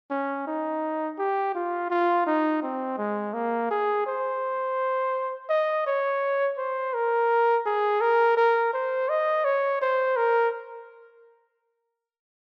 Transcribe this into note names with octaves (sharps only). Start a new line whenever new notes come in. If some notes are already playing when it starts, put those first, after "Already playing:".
C#4
D#4
G4
F4
F4
D#4
C4
G#3
A#3
G#4
C5
D#5
C#5
C5
A#4
G#4
A#4
A#4
C5
D#5
C#5
C5
A#4